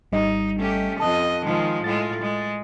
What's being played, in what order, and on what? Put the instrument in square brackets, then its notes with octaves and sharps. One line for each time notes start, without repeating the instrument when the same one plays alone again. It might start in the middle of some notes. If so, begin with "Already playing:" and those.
[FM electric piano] G#1 G3 D#5 [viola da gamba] D#4
[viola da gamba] A3 C#4 G4
[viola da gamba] F2 D#5 [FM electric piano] A5 D#6 F#6
[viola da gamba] D#3 F3 G#3
[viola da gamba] A2 G#3 F4 [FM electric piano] A6
[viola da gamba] G#3